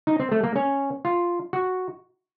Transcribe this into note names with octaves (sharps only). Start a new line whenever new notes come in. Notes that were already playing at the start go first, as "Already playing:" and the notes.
D#4
C4
A3
A#3
C#4
F4
F#4